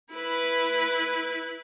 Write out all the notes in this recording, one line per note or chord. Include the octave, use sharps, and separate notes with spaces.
E4 B4